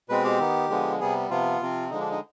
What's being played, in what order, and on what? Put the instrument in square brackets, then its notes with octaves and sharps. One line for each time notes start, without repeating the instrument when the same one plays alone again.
[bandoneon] B2 G#3 C4 B4
G4
D#3 B3
D3 F3 G#3 B3
C3 G3 B3 G#4
C3 F3 B3 F4
C3 F3 C4
D3 F3 G#3 D#4
D4
D#4